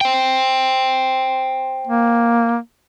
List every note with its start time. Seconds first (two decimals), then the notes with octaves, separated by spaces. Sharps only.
0.01 C5 G5
1.87 A#3